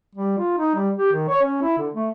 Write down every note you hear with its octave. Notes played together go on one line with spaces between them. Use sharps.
G3
F4
D#4
G3
G4
D#3
C#5
C#4
E4
D3
A3